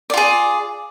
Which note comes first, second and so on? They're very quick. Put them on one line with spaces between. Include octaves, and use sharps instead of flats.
D5 F4 G#4